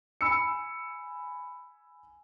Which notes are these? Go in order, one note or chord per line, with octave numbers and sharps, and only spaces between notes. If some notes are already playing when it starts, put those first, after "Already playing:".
G#5 B5 E6 C#7